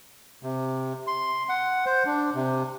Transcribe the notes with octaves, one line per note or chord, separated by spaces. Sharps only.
C3
C6
F#5
C5
D4
C3